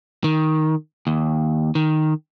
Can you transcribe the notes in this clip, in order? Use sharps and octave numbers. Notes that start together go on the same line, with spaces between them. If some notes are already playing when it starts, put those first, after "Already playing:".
D#3
D#2
D#3